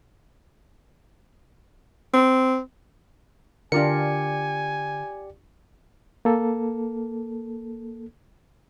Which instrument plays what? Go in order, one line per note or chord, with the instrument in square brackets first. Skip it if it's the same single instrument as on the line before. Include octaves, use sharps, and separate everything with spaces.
[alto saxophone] C4
[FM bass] D3 [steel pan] D4 F4 A#4 [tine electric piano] G4 D5 C#7 [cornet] G#5
[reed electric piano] A#3 A4